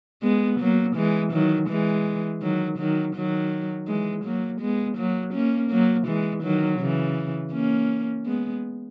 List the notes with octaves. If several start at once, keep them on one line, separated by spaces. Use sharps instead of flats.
G#3 B3
F#3 A#3
E3 G#3
D#3 F#3
E3 G#3
D#3 F#3
D#3 F#3
D#3 F#3
E3 G#3
F#3 A#3
G#3 B3
F#3 A#3
A#3 C#4
F#3 A#3
E3 G#3
D#3 F#3
C#3 E3
A#3 C#4
G#3 B3